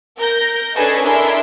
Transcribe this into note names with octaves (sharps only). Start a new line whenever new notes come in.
A#4 G6 A#6
C#4 D4 G#4 A4 B4 D#5
D4 E4 G#4 A#4 E5 C6